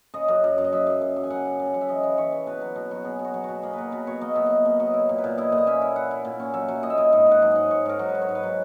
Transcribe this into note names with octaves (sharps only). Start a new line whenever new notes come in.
C#3 D#5
F#2
F#2
F#2
D#5
F#2 E5
F#2
F#2
F#2
G#5
C#3 F#5
C#3
C#3
G#5
F#2 F#5
E5
E3 D#5
E3
E3 C#5
E3
B2 B4
F#3
B2
F#3 F#4
B2 G#4
B2
F#4
F#3
B2 F#4
A#3 G#4
F#3 A#4 B4
B2 B4
B2 C#5
A#3 D#5
B2 E5
A#3 D#5
B2
F#3 D#5
E4
A#2
B4
A#2
E4 D#5
A#2
D#5
C#4 E5
E4
E4 F#5
E4
A#2
C#4
F#3 E5
F#3
A#2 D#5
E5
E4 D#5
G#2 D#5
G#2 F#5
F#3
G#2 D#5
G#2 C#5
G#2 A#4
F#3
B4
F#3
C#5
G#2
B4
F#3